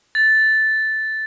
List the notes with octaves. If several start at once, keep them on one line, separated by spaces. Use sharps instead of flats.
A6